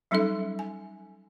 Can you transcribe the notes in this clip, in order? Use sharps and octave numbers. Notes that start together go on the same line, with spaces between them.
F#3 G3 C#4 D#4 A4 E5
G#5